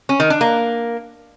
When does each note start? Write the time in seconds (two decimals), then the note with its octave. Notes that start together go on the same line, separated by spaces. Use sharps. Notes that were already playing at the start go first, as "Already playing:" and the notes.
0.09 C#4
0.20 D#3
0.30 D4
0.41 A#3